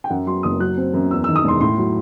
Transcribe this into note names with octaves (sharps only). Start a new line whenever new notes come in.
G5
F#2 F#5
F#3 C6
F#1 D#6
F#3 F#6
C4
F#2
E2 E6
E6
D#3
D#6
E1 C6
A2 C6
F#3